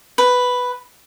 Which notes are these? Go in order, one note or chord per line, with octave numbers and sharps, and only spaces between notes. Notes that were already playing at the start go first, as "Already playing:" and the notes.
B4